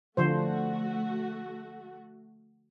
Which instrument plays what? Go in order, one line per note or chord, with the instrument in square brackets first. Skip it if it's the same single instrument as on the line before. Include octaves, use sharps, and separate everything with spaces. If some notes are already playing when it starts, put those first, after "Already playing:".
[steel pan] D3 F3 C5 [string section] A3 F#4